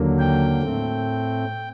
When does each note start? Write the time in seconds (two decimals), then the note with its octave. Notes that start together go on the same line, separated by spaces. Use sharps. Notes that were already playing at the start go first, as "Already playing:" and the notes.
Already playing: D#2 D3 F#3 A#3
0.19 G5
0.62 A2 A3 C4